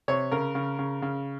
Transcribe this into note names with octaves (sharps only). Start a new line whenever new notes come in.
C3 C#5
C#3 A#4
C#3
C#3
C#3